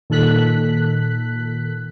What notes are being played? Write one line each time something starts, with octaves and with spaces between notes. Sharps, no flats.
A#2 D#3 A4 F#6 B6